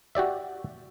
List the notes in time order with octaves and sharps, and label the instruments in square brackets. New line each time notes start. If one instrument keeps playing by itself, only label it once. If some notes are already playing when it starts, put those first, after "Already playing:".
[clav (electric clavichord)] F#4 G4 D5 E5